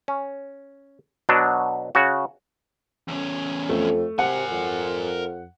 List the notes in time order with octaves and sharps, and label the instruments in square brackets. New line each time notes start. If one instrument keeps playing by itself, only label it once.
[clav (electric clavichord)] C#4
B2 F#3 D4
C#3 F#4
[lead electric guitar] E2 C#4
[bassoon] F2 [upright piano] A3
[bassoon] C3 [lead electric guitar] A#4 G#5 [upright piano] F#5
[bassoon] F2